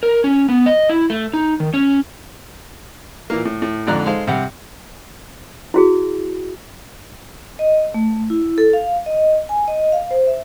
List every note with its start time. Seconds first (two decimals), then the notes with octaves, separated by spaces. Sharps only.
0.03 A#4
0.24 C#4
0.49 B3
0.66 D#5
0.89 E4
1.10 A3
1.33 D#4
1.60 D#3
1.73 C#4
3.30 A#2 E3 A#3
3.45 A2
3.62 A2
3.87 F2 G#2 D3 D5 A#5 F#6
4.06 G#3 D#4 A4 C5 F5
4.27 G2 C3 G3 F#5
5.74 E4 F#4 G#4
7.59 D#5
7.94 A3
8.30 E4
8.58 A4
8.73 F5
9.06 D#5
9.49 G#5
9.68 D#5
9.92 F5
10.11 C5
10.27 E5